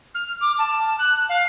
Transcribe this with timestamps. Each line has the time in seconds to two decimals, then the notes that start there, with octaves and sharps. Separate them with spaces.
0.15 F6
0.41 D6
0.59 A5
0.99 F#6
1.29 F5